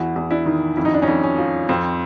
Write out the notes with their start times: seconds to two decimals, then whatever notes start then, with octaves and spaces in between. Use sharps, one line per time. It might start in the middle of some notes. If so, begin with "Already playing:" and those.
Already playing: E2 E4 F#4
0.16 E2
0.31 D4 E4
0.46 D#3
0.77 F2 E4
0.85 D#4
0.94 D4
1.02 C#4 D#4
1.08 F2
1.23 C#4
1.38 F3
1.69 F2 C4